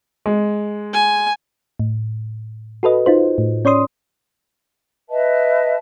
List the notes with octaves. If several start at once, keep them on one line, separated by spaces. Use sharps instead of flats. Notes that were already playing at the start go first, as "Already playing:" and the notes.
G#3
G#5
A2
F#4 A4 B4 D#5
D#4 F4 C5
A2
C#4 C#5 D5 C6 D#6
B4 D#5 E5 A5